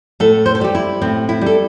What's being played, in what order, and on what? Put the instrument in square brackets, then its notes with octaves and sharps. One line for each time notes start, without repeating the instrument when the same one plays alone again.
[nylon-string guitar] A2 A4
C5
A4
G3 G4
E4
A2 C4
E4
G3 A4